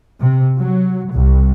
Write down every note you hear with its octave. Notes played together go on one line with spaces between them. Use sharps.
C3
F#3
C2